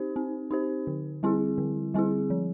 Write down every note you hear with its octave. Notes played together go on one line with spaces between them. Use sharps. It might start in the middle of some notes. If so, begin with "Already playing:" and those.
Already playing: C4 D#4 G4 C5
C4
D#4 G4 C5
D3
G3 C4 E4 G#4
D3
G3 C4 E4 G#4
F3